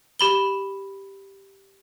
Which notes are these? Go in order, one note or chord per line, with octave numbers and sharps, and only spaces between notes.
G4 B5 G7